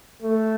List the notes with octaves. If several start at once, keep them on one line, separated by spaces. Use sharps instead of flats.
A3